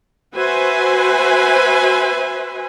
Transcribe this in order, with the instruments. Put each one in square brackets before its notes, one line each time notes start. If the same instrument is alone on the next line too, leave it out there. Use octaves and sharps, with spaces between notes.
[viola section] F#4 B4 C5 E5 G#5